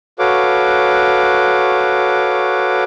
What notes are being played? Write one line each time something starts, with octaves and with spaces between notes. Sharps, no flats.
F#4 A4 B4 C#5 F5 D6